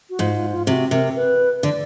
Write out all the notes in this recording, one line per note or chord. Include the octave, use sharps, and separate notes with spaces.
F#4
G#2 F4
F4
F4
C3 F#4
C3 A#4
B4
D3 D5